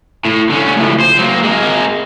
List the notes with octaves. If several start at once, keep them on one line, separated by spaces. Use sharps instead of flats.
A2
D3 C#4
C#2 A2
C5
F#3 A#3
G#3 A#4